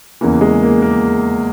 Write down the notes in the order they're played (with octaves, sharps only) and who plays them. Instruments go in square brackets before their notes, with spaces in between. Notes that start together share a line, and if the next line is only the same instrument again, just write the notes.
[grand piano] E2 C#3 E3 A#3
G#3
A#3
A#3